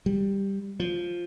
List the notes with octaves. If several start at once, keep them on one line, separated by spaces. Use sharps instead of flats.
G3
F3